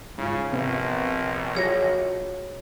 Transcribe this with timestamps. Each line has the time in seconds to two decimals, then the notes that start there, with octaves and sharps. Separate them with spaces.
0.18 G#2 C#3 F4
0.52 A#1 C3 B3 C4
1.55 F#3 F4 F#4 G#4 C#5 A#6